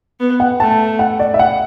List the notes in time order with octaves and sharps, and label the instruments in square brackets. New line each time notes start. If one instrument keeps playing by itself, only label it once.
[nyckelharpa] B3
[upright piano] F#5
[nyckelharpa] A3 [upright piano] A5
[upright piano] F#5
D5
E5
F#5